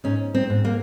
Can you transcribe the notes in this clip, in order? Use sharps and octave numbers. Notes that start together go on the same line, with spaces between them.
G#2 C#4
C4
G#2
A#3